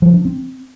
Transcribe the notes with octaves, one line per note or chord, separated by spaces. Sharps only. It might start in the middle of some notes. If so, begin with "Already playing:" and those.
F3
D4
C4